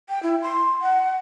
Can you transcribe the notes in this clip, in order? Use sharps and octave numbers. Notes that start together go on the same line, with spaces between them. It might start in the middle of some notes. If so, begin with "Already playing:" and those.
G5
E4
C6
F#5